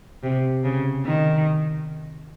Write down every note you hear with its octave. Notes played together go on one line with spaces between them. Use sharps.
C3
C#3
D#3